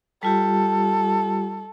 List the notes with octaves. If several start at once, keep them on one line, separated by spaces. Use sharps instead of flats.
G3 F4 G4 A4